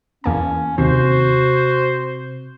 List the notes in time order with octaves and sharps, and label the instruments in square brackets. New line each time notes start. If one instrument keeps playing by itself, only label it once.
[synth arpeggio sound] E2 A#3 A5 [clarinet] C#4
[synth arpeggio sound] D#2 [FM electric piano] C3 [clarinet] F#4 [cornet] C5